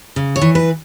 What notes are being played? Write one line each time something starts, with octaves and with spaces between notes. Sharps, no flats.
C#3
C#5
E3
B4